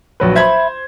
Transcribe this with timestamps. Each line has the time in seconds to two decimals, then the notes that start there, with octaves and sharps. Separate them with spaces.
0.20 A#1 F#3 B4
0.36 C5 E5 B5 G#6